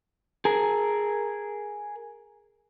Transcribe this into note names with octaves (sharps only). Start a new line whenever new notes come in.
G#4 A#4